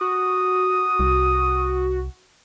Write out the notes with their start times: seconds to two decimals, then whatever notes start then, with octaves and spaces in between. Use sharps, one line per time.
0.01 F#4 D#6
1.00 C2